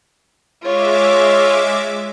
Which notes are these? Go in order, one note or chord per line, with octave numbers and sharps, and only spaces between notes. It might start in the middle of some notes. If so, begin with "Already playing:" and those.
G#3 F4 C#5 E5 D6